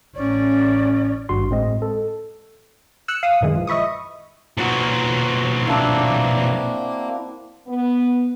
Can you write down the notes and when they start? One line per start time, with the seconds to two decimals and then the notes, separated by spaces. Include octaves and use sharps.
0.15 A1 C#4 D5
1.29 G#1 G2 F#4 C6
1.50 A2 G#3 C4 D#5
1.82 A4
3.08 E6 F#6 C#7
3.23 F5 D#6
3.41 A#1 F#2 D#3 E3 G#3
3.55 F3
3.67 D#5 E5 B5 C#6 D#6
4.57 B1 A#2 F#4 C5
5.67 A#3 C4 D4 E4
7.67 B3